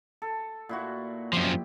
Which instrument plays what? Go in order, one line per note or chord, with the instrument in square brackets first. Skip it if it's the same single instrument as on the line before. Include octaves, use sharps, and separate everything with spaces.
[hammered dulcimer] A4
A#2 E4 F#4
[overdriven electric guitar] F#2 F3 [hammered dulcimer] G4